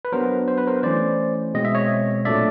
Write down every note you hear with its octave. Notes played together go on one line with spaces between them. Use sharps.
B4
F#3 B3 D4 A#4 C5
C5
B4
A#4 C5
E3 A3 C#4 E4 C5 D5
B2 G#3 C4 D#5
E5
C#5 D#5
A#2 F#3 A3 D4 D5 E5